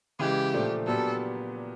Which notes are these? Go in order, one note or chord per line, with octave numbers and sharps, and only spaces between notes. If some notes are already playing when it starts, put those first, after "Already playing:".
C#3 E3 G#3 G4
A#2 F3 A3 D4
A#2 F#3 B3 D4 G4 A4